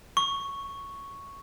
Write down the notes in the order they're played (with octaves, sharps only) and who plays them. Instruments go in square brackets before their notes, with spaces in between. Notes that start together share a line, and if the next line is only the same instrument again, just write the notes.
[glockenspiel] C#6